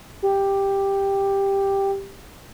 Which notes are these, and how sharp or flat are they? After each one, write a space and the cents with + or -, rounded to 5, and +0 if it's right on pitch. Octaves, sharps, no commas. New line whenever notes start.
G4 +5